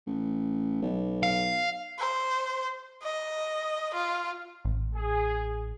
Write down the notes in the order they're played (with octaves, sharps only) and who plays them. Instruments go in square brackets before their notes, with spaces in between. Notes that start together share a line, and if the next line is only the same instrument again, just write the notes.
[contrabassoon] A1
B1
[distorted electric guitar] F5
[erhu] C5
D#5
F4
[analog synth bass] A1
[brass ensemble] G#4